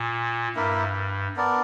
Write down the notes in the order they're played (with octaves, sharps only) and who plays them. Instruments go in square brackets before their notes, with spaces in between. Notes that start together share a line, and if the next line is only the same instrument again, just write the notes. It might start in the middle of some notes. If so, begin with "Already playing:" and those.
Already playing: [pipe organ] A#2
[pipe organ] G2 [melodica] A#3 E4 A#4 E5
[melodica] B3 D4 A#4 D5